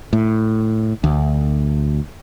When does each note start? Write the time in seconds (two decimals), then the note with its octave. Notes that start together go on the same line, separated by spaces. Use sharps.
0.13 A2
1.04 D2